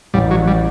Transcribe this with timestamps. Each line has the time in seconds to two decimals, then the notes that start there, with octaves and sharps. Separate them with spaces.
0.14 A1 G3
0.31 F#3
0.47 G3